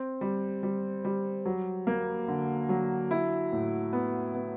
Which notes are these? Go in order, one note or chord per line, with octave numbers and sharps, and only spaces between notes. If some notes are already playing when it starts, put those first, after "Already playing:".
Already playing: C4
G3
G3
G3
F#3
A#3
D3
F#3
E4
A2
B3
B3